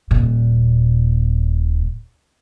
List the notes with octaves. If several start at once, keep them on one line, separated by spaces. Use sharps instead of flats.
D#1 A#2